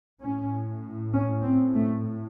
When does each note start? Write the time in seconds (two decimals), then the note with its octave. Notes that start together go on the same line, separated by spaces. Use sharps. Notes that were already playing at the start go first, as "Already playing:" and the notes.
0.23 A2 C#4
1.13 C#4
1.43 C4
1.75 A3